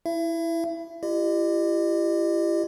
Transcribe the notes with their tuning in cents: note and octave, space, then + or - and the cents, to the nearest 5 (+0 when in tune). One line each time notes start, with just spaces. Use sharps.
E4 +0 E5 +30
E4 +45 G4 +0 D#5 -40